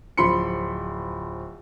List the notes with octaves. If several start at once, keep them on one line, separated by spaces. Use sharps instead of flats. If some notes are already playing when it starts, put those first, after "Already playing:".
D1 F3 B5 C6 C#7